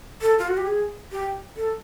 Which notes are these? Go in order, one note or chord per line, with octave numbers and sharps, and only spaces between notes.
A4
F4
F#4
G4
G#4
G4
A4